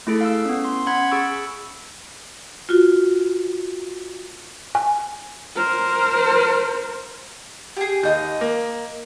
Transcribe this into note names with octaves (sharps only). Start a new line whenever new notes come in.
A3 E4 G#4 A4
F5 E6
B3 C#4
C6
C#4 F#5 B5 G#6
G#4 B5 C#6 E6
F4 F#4
G#5
A#4 C5
G4 G#4
D#2 D#5 G6
A#3